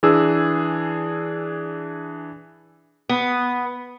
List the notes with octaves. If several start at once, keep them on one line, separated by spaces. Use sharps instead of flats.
E3 D4 G#4 E6
B3